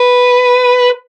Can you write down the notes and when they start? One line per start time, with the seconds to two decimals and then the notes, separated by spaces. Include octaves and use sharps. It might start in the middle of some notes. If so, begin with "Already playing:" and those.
Already playing: B4